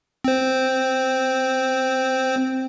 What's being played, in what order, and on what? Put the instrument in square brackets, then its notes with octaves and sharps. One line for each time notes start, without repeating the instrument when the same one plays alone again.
[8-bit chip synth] C4 C5